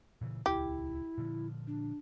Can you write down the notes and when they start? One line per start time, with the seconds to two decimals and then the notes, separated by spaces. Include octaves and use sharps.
0.21 A#2 C#3 E3
0.46 D#1 C#2 E4 G4
1.18 A#2 D3 F3
1.67 D4